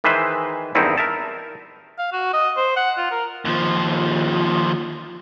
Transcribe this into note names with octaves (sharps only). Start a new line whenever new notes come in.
D#3 E3 G#3 B4 C5 E5
E2 G2 D#3 C4 D#4 E4
A#4 E5 A5
F5
F#4
D#5
C5
F#5
F4
A#4
D#2 F3